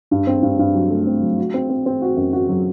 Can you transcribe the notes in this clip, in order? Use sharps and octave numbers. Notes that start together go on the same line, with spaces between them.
G2
C4
G2
G2
F#3
A3
C4
F#3
F#4
C4
C4
C4
F#4
F#2
F#4
F#3